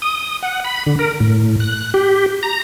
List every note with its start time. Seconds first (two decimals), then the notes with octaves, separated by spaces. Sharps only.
0.02 D#6
0.42 F#5
0.64 B5
0.86 D3
0.99 A#4
1.20 A2
1.60 F#6
1.94 G4
2.43 A#5